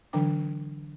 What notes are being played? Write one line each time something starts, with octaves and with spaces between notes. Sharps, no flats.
D3 E3 F#3 D4 G5 D6